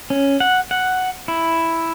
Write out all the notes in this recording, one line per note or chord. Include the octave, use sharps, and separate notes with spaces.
C#4
F#5
F#5
E4